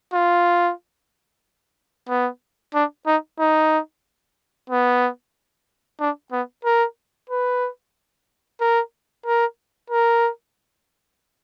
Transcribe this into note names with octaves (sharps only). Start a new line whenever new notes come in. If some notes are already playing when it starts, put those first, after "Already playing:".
F4
B3
D4
D#4
D#4
B3
D4
B3
A#4
B4
A#4
A#4
A#4